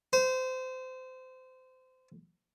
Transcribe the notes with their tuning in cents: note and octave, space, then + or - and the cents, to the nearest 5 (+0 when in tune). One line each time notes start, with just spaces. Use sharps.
C5 -25